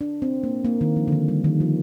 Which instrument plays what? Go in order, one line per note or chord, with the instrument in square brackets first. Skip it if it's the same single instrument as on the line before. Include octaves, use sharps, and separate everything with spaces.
[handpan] D4
C4
A#3
A#3
D#3
F3
D3
D#3
G3
D#3
F3